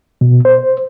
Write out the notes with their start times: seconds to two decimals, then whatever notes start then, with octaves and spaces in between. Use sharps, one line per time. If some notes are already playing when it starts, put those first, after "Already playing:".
0.21 B2
0.45 C5